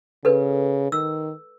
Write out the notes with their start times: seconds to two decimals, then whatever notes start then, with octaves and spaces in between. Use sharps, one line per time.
0.25 C#3 A4 B4
0.92 D#3 E6